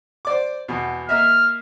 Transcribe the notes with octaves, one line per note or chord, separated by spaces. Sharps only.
C5 D5 D6
E2 B2
A#3 D#5 E5 F6